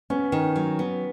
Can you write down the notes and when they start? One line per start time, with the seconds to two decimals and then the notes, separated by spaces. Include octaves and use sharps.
0.10 B3 C#4
0.32 D#3
0.56 F#3
0.79 B3